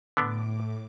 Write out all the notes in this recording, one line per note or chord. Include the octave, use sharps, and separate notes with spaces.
A2 D3 B3 D4 D6